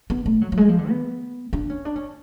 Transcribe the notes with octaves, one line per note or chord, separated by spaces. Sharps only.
B3
A3
F#3
F#3
G#3
F3
D3
B3
D4
C#4
D4
C#4